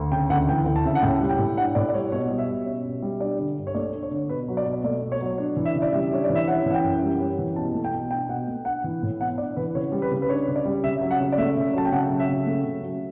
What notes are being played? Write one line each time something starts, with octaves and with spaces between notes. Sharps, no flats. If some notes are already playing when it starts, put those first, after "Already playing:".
Already playing: D2
C#3 G5
D2 F#5
E3 G5
D2
A5
C#3 E5
F#5
A2 G5
G3
G5
A2
D4 F#5
A2 D5
D5
G3 C#5
B2 C#5
G3
E5
B2
C#4
B2
G3
D4 D5
D3
G2
C#5
A3 D5
D4
C#5
D3
B2 B4
F#3
D5
B2
A3 D5
B2
C#5
F#3
D4
E3
E5
C#3
D5
G3 E5
D4 C#5
D5
E3
E5
C#4 F#5
E3 F#5
G5
F#2
G3
C#4
E3
B2 A5
A3
G5
B2
D4 G5
B2 F#5
A3
D4 F#5
E3
A2
B3 F#5
D4 D5
E3 B4
C#3 C#5
G3
B4
C#3
B4
D4 C#5
C#3
D5
G3
C#3 E5
F#3
F#5
C#3
D5
A3 E5
C#3
F#3 A5
G5
C#3 F#5
F#3
E5
C#3
A3
C#3
F#3